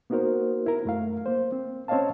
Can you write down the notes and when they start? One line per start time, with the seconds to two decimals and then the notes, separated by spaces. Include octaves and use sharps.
0.10 A#3 B3 D#4 F#4 A#4 C5
0.66 E4 A#4
0.85 F#2 A3 F5
1.26 A#3 C5
1.52 C4
1.88 C4 C#4 C#5 D#5 F5 A5